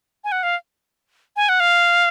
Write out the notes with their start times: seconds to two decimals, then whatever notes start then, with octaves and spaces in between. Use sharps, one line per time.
0.24 G#5
0.32 F#5
0.43 F5
1.36 G#5
1.49 F#5
1.60 F5